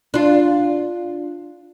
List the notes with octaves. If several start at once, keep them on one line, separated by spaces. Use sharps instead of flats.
D4 F4